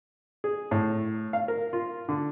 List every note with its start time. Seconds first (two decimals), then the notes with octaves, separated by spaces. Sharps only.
0.44 G#4
0.71 A2
1.33 F5
1.48 A#4
1.73 F4
2.09 D3